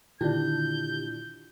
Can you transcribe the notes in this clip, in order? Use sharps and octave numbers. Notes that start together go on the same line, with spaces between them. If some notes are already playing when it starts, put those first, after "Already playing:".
A#2 D3 D#3 D4 E4 F4 G4 G6